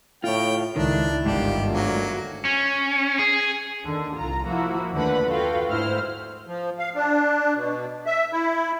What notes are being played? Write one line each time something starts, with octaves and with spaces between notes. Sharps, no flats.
A2 F4 C#5 G5
C#2 D#3 D4 E4
G1 G#2 D#3 G3 D4 F4 G4
D2 F#3 A#3
C#4
G#4
D#2 D3
C2 F4 A#5
F3 A#3 E4 F#4
D#2 D3 A3 B4 F#5 B5
F4 F#4 A4 B4 F5 G5
D2 G#2 E4 C5 F6
F3
F5
D4
B2
E5
E4